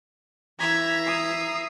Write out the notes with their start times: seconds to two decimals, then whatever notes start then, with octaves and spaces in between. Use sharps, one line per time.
0.59 E3 E5 A#5 G#6 B6
1.05 D#6 C7